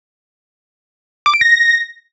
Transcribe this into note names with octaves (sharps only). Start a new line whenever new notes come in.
D6
D7
A#6